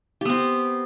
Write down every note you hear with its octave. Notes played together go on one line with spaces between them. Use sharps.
B3 C4 G4